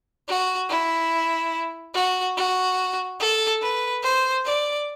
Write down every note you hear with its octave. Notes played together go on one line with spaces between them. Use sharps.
F#4
E4
F#4
F#4
A4
B4
C5
D5